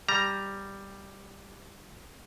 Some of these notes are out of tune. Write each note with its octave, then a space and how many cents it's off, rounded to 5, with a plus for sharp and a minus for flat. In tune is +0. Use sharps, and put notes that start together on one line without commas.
G3 +0 A#5 +0